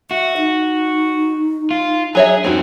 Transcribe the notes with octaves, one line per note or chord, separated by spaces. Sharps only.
F#4 E5
D#4
F4
F#3 D4 G#4 C#5 E5
F#2 C4 C#4 D#4 E4 F#4